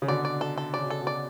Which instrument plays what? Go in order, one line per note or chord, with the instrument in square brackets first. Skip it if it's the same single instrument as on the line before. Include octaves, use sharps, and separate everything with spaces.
[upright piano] C#3
[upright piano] B2 D3 [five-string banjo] D5
[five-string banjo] D5
A4
A4
[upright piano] C#3 [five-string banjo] D5
[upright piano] B2
[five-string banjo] A4
[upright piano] B2
[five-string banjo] D5